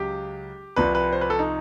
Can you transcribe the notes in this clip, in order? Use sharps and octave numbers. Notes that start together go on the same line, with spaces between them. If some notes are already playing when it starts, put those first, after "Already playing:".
Already playing: C#2 C#3 F#3 G4
C2 C3 F3 B4
B4
C5
B4
A4
D#4